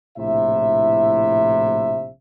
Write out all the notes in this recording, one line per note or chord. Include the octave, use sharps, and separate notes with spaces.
A#1 A2 C3 E4 E5